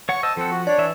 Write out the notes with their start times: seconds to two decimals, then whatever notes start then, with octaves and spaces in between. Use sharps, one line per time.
0.09 C#5 F#5 C#6
0.23 C5 D#5 A5 E6
0.37 F3 C4 A4 F#5
0.50 F#4
0.67 D4 C#5 D5
0.78 E3 E5